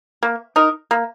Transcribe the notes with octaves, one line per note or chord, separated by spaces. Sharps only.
A#3
D#4 A#4
A#3